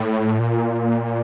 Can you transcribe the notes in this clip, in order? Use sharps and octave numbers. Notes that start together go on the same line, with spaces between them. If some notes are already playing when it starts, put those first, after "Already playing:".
Already playing: A2
A#2